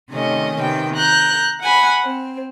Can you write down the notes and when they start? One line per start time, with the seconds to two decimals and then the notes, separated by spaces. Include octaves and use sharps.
0.11 C3 D#3 A3 C#4 D#5
0.59 C3 D#3 B3 G5
0.94 A#5 F#6 G6
1.62 F#5 G#5 B5
2.04 C4